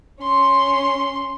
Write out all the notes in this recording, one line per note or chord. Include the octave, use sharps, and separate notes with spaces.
C#4 C6